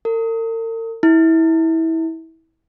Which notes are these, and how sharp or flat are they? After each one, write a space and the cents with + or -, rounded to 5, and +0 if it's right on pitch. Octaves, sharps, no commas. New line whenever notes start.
A#4 -45
E4 -25